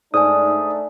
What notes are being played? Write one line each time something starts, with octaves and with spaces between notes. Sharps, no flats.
G#2 A3 D4 D#4 D5 G#5 D#6